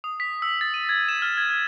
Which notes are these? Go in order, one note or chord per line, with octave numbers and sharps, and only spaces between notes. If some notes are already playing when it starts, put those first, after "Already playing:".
D#6
B6
E6
A6
D#7
G#6
E7
F6
G#6
G#6